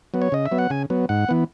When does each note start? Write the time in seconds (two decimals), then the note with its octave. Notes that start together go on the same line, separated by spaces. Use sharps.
0.14 F#3 B3
0.22 C#5
0.32 C#3 D#5
0.46 E5
0.52 F#3 B3
0.58 F#5
0.70 C#3 G#5
0.90 F#3 B3
1.09 G#2 F#5
1.29 E3 B3